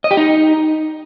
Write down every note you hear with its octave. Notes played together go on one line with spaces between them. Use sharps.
D#5
G4
D#4